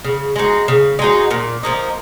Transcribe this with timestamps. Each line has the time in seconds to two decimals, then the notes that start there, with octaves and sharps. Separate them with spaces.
0.04 C#3
0.36 G#3 D#4 F#4
0.68 C#3
0.99 G#3 D#4 F#4
1.31 A#2
1.63 F3 A#3 D#4